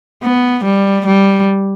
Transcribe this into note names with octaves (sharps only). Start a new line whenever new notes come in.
B3
G3
G3